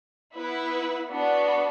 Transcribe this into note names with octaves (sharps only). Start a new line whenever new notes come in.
B3 E4 B4
B3 D4 F#4